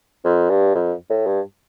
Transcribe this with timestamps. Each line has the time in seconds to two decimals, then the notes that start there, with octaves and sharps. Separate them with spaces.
0.24 F2
0.50 G2
0.75 F2
1.10 A2
1.27 G2